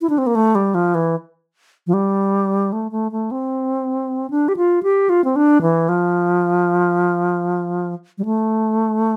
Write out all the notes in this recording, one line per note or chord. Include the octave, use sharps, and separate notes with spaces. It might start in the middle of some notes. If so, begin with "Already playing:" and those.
E4
D4
C4
A#3
A3
G3
F3
E3
F3
G3
A3
A3
A3
C4
D4
G4
F4
G4
F4
C4
D4
E3
F3
G3
A3